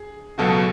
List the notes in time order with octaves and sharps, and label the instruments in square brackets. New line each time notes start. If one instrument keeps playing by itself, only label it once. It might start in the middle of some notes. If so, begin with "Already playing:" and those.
Already playing: [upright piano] G#4
[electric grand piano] C#2 B2 F#3 [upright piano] F#4 A4